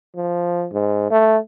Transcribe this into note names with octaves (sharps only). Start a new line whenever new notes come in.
F3
G#2
A3